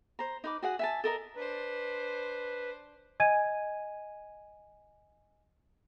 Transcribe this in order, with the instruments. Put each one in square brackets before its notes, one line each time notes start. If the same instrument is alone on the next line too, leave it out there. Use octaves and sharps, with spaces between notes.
[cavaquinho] C5 A#5
D#4 B4 D6
F#4 G#4 F#5
E5 G#5 A5
A4 A#4 D#5 A#5
[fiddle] D4 C5 [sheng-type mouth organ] B4
[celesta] D#5 G#5 G#6 D#7